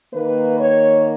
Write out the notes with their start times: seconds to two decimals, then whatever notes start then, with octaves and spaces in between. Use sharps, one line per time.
0.13 D#3 A#3 B4
0.59 C#5